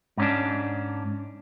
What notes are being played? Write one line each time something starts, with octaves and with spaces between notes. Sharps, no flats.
G#2 C#4 D4